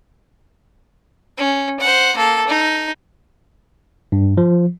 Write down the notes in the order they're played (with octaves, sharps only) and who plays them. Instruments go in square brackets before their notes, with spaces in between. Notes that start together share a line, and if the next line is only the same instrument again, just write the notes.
[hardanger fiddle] C#4
C5 F#5
A#3 A4
D#4
[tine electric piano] G2
F3